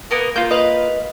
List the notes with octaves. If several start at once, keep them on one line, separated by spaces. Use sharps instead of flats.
A#3 B3 A#4
A#3 F4 G6
B4 D#5 F5